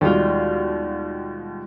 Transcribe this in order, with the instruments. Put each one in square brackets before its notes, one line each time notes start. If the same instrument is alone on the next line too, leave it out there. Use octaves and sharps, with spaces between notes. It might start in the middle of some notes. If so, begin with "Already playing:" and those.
[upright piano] D#2 B2 [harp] G3 G#3 F4